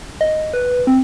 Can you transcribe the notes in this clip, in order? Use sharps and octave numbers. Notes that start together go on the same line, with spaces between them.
D#5
B4
C4